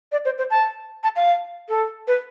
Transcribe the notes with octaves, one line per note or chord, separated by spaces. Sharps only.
D5
C5
C5
A5
A5
F5
A4
B4